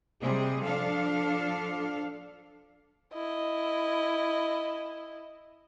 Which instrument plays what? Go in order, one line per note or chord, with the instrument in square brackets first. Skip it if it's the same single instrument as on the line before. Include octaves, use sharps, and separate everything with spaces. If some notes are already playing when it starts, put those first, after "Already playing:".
[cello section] C3 G3 G#3 G#4
F3 D4 A4 F5
[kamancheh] E4 D#5